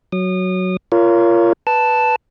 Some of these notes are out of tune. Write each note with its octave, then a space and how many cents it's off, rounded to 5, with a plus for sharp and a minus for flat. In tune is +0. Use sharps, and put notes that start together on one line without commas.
F#3 +0 D#6 -30
F4 -20 A#4 +0 C#5 +25
B4 +0 A5 +0